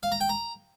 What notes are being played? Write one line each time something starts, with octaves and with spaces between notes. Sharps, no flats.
F5
A#5
G5
A#5